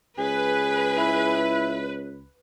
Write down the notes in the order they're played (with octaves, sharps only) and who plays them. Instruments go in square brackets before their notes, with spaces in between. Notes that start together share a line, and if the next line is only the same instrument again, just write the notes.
[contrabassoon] C#2 [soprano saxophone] G#4 [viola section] B4
[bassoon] E4